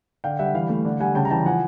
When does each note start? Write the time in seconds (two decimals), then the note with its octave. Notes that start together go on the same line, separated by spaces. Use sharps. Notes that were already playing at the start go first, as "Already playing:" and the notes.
0.24 D3 F5 G5
0.39 G3 E5 F#5
0.54 E3 F5
0.69 A3
0.85 D3
1.00 G3 F#5 G#5
1.15 C#3 G5 A5
1.25 A#5
1.31 E3 G5 A5
1.46 F3 F#5 G#5